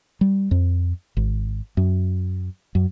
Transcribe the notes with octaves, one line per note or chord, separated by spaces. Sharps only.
G3
F2
G#1
F#2
F#2